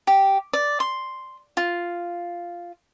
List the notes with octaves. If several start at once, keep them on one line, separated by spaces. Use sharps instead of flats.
G4
D5
C6
F4